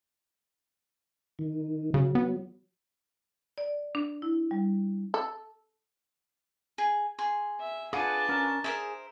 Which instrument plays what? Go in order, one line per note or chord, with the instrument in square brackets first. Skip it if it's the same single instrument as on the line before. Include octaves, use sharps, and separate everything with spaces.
[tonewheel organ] D#3
[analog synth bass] C#3 [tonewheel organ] F#3
[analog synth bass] B3
[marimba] D5
D4
E4
G3
[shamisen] A4
[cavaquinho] G#4
G#4 C6
[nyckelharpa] E5
[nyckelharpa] D4 A5 [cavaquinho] F4 B4 [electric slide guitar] G#4 F#5 G#5
[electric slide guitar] C#4 A#4
[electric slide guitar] G#4 [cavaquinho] A#4 C5 E5